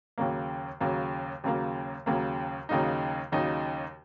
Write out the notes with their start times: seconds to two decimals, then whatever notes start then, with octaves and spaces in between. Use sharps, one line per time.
0.18 D#2 C#3 F#3 A#3
0.80 D#2 C#3 F#3 A#3
1.44 D#2 C#3 F#3 A#3
2.06 D#2 C#3 F#3 A#3
2.69 D#2 C#3 F#3 A#3 D#4
3.32 D#2 C#3 F#3 A#3 D#4